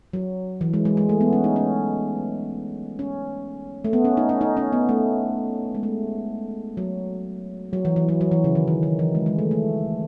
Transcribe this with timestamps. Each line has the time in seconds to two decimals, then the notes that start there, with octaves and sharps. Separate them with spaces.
0.13 F#3
0.61 E3
0.73 G#3
0.85 G#3
0.97 G#3
1.09 A3
1.21 B3
1.33 C#4
1.44 D#4
1.56 C#4
2.99 C#4
3.85 A3
3.93 B3
4.05 C#4
4.17 D#4
4.29 C#4
4.41 D#4
4.57 C#4
4.73 B3
4.89 A3
5.75 G#3
5.83 A3
6.77 F#3
7.73 F#3
7.85 E3
7.96 E3
8.09 F#3
8.21 F#3
8.31 E3
8.44 C#3
8.55 D#3
8.68 D#3
8.83 D#3
8.99 E3
9.15 G#3
9.26 G#3
9.39 A3
9.51 A3